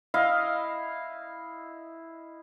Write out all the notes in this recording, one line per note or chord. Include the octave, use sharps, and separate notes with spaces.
E4 D#5 F5